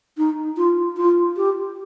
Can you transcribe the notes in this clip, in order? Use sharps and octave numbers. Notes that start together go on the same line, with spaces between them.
D#4
F4
F4
G4